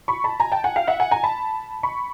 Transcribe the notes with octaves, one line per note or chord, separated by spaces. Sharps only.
B5 C#6
A5 B5
G#5 A#5
G5 A5
F#5 G#5
F5 G5
E5 F#5
F#5 G#5
G#5 A#5
A5 B5
B5 C#6